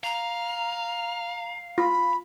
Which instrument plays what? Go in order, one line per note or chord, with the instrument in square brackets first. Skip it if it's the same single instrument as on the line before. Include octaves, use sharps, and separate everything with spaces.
[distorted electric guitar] F5 [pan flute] A#5
[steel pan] F4 [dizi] B5